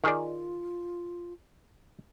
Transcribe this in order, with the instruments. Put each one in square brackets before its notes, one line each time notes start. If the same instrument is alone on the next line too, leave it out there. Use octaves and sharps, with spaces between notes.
[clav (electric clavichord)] D#3 G#4 D5 [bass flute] F4